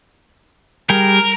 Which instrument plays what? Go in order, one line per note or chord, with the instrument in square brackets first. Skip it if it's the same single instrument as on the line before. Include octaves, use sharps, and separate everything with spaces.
[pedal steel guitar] G3 G#4 G5 [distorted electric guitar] A#4